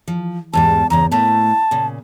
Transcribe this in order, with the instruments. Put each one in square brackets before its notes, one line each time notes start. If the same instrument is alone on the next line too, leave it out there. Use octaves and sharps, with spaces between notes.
[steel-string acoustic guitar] F3
[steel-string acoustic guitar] E2 G#2 G3 [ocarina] A5
[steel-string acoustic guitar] E2 G2 C#3 [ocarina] A#5
[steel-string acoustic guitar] A2 A3 A#3 [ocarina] A5
[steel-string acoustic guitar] A#2 C#3